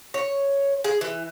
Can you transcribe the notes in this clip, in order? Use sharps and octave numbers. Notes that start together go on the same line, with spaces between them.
C#5
G#4
E3